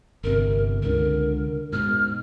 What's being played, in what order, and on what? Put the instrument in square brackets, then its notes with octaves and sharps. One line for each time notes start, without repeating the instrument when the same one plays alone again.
[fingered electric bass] G1 C3 [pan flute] A#4
[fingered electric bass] C#2 D3 [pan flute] A#4
[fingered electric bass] G#2 B2 [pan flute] F6